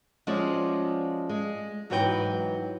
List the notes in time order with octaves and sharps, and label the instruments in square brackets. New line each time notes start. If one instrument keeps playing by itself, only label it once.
[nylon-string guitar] F3 G#3 C#4 F4 F#4 D5
G#3
G#2 E3 F#3 F#4 B4 G5